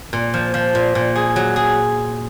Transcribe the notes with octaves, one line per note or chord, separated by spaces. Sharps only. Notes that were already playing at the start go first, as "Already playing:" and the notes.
A#2
F3
F3
A#2
A#2
G#4
F#3
G#4